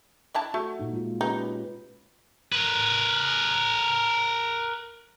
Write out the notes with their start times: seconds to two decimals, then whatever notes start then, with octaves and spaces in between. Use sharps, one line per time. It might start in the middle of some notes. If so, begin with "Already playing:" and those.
0.34 D4 E4 A5
0.54 A3 F#4
0.79 A#2 D#4
0.93 G#3 F4
1.21 C#4 D#4 G4 B4
2.52 A#4 B4